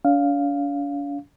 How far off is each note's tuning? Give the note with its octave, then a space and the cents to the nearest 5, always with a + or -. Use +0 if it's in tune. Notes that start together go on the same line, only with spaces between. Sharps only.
D4 -45 F5 +0